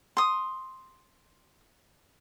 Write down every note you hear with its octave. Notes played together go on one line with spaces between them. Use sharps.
C6 D#6